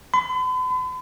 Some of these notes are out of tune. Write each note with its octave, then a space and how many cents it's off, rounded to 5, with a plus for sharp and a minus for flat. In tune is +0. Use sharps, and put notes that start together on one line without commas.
B5 +45